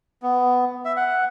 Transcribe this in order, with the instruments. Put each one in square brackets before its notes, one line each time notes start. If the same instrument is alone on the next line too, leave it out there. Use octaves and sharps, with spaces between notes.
[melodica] B3
E5
F#5